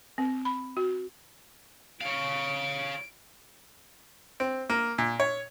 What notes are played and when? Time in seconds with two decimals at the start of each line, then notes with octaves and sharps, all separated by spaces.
0.18 C4
0.45 B5
0.77 F#4
2.01 C#5 F5 D7
4.40 C4
4.69 A#3
4.98 A#2
5.20 C#5